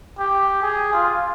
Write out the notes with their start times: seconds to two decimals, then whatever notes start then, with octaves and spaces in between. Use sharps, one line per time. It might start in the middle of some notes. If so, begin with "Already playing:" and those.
0.18 G4
0.63 G#4
0.93 F4